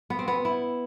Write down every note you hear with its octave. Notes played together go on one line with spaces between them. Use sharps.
B3
C4
B3
E4